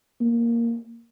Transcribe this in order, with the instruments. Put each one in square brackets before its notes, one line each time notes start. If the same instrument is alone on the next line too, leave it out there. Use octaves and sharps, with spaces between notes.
[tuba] A#3